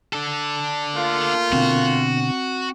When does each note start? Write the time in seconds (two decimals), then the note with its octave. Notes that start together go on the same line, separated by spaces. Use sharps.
0.13 D4 A4
0.94 A3 A#3 F4
1.53 B2 D3 C4 F#4